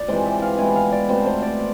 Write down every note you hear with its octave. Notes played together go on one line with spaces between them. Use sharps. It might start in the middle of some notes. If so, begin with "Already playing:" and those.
Already playing: D5
C3 E3 G#3 C5
E5
F5
B2 G#3 C4 E4 G#5
F5
D5
B2 A3 C4 C5
C5
D5